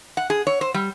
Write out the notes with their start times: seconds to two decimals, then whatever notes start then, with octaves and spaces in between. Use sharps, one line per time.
0.17 F#5
0.30 G#4
0.47 C#5
0.61 C5
0.74 G3